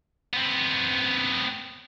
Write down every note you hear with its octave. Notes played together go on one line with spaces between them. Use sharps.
B3 C4